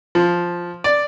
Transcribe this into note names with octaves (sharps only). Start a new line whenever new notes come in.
F3
D5